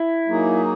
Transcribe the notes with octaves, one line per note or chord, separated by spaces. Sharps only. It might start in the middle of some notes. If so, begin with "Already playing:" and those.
Already playing: E4
F#3 A#3 D#4 G#4